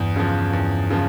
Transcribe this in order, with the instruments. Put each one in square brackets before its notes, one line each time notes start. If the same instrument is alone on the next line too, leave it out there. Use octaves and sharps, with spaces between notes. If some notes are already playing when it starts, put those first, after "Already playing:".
Already playing: [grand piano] E2 [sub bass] G2
[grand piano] C#3 F3
E2
C#3 F3